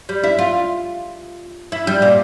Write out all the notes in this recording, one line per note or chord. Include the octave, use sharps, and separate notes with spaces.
G3
E4
F4
E4
G3
A#2